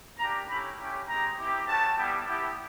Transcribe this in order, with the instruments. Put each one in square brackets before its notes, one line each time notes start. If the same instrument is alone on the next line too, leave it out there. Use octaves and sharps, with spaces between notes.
[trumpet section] A#3 D4 G4 A#5
A3 C#4 E4 G4 B5
A3 C#4 E4 G4
G#3 C4 D#4 G4 A#5
C4 E4 G4
A3 C#4 F#4 A5
G3 B3 E4 G4
B3 E4 G4